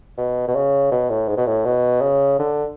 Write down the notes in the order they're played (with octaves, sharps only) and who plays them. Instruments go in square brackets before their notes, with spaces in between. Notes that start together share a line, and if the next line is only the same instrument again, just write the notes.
[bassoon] B2
B2
C#3
B2
A2
G#2
B2
A2
B2
C#3
D3